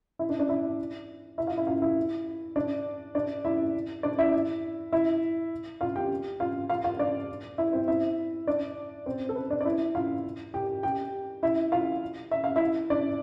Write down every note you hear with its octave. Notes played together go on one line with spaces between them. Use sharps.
E4 E5
D4 D5
D4 D5
E4 E5
E4 E5
F4 F5
E4 E5
F4 F5
E4 E5
D4 D5
D4 D5
E4 E5
D4 D5
E4 E5
E4 E5
F4 F5
G4 G5
F4 F5
F4 F5
F4 F5
D4 D5
E4 E5
C4 C5
E4 E5
D4 D5
C4 C5
A4
B4
D4 D5
D5
E4 E5
F4 F5
G4 G5
G4 G5
E4 E5
F4 F5
E5
F5
E4 E5
D4 D5